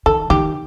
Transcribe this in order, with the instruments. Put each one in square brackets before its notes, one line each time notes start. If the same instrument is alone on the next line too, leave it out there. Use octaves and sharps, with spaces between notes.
[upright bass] D#3 [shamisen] A4
[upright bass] D#3 [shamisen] G4